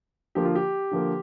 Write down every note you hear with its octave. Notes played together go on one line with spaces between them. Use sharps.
D3 F3 A#3 G4
F4
G4
D3 F3 A#3